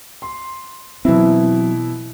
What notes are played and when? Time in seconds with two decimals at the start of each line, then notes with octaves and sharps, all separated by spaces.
0.22 C6
1.05 B2 E3 F#3 C4 E4